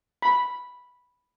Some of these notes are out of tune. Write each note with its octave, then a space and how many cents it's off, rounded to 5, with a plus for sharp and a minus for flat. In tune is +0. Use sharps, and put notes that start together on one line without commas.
B5 -5